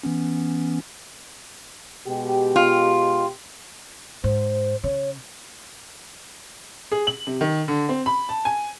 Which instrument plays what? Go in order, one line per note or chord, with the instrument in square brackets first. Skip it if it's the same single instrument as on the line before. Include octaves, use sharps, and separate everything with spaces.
[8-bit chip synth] E3 B3 C#4
[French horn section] B2 G#3 G4
[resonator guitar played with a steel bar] F4
[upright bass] G#2 [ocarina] C5
[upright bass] C#3 [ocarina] C#5
[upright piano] G#4
F#7
C3
D#3
D3
C4
B5
A5
G#5